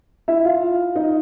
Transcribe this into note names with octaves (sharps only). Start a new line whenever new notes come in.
E4 E5
F4 F5
D#4 D#5